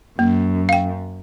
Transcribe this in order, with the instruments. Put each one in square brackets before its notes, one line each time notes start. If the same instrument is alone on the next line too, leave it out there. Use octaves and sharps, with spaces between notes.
[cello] F#2 [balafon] A#3
[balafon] F5 G5